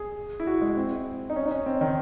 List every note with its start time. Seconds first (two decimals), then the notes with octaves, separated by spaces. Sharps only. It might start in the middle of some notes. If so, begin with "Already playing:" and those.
Already playing: G#4
0.40 E4
0.47 F#4
0.62 G#3
0.77 C4
1.30 D#4
1.36 C#4
1.46 D#4
1.51 C#4
1.66 C4
1.81 D#3